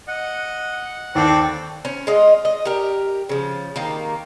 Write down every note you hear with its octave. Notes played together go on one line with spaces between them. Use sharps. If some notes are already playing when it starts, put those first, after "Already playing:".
D#5 F#5
D#2 C4 A4 D5 G5
C#4 C5
G#3 F4 D#5
D#5
G4 A#4
C#3 F3
D#3 A#3 G4